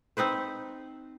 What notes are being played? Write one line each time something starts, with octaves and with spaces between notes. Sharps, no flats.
C4 D#4 B4 C5